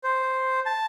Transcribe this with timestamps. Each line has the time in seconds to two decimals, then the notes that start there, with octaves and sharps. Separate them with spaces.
0.04 C5
0.66 A5